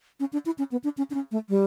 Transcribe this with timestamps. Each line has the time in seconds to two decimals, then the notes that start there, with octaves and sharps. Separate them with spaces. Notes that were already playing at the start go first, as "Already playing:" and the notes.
0.20 C#4
0.33 D4
0.46 E4
0.58 C#4
0.72 B3
0.84 D4
0.98 C#4
1.10 D4
1.14 C#4
1.31 A3
1.49 G3